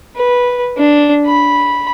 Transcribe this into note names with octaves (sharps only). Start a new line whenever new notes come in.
B4
D4
B5